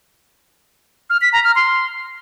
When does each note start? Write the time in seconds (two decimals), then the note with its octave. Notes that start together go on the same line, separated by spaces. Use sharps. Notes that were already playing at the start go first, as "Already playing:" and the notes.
1.10 F6
1.21 B6
1.33 A#5
1.44 F6
1.56 C6